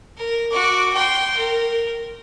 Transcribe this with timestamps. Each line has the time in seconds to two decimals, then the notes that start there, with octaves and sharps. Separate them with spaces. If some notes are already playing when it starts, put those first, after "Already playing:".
0.18 A#4
0.51 F#4 D6
0.93 G5 C6
1.37 A#4